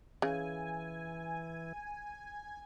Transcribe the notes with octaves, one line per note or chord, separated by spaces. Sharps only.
C#3 E3 G#5